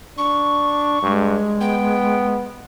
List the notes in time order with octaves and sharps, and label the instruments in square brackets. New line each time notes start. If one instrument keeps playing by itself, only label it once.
[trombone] D4 [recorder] C#6
[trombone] G2 [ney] G#3
[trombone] B3 [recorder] G5